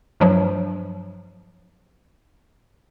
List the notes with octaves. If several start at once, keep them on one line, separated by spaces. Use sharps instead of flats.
G2 F3 F#3